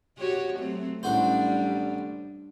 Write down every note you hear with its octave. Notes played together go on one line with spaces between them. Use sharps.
F#4 G4 C#5
F#3 A3 C4
A1 G3 D4 F#4 C5